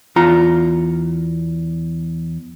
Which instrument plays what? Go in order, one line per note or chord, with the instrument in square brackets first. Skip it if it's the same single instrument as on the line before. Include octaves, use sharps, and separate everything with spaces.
[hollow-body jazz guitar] E2 F4 A#5